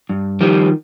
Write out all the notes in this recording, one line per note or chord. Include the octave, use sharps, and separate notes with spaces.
G2
D#3 F3 G3